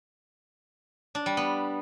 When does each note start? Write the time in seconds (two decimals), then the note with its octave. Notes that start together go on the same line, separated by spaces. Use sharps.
1.15 D4
1.26 G3
1.37 B3